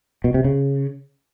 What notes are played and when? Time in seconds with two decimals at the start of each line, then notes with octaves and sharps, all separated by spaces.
0.24 B2
0.34 C3
0.44 C#3